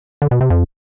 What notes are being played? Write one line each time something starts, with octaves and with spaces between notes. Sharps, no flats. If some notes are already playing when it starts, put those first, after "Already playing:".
D3
B2
C3
F2